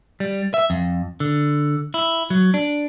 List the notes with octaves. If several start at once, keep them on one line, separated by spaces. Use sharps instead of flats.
G3
E5
F2
D3
E4
F#3
D4